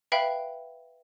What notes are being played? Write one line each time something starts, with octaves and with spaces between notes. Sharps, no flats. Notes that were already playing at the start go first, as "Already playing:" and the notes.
B4 E5 F5 G5 B5